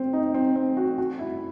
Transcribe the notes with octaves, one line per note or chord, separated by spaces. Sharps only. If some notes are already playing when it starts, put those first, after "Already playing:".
Already playing: C4
D#4
C4
C4
F#4
F#4
E4